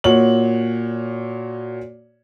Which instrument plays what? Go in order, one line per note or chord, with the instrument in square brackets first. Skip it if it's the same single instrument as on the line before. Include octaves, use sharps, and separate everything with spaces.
[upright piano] A#2 F#4 C#5 F#7